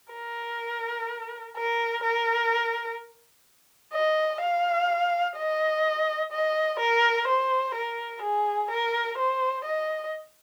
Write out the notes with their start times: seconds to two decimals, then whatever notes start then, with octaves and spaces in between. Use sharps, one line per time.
0.13 A#4
1.56 A#4
2.03 A#4
3.94 D#5
4.41 F5
5.37 D#5
6.32 D#5
6.80 A#4
7.28 C5
7.75 A#4
8.22 G#4
8.71 A#4
9.18 C5
9.65 D#5